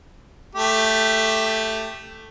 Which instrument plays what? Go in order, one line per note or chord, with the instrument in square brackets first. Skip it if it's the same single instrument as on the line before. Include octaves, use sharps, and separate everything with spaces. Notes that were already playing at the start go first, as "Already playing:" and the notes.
[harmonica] A3 G4